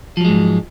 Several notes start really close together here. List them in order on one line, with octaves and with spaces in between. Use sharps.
F3 F#3 G#3 G#2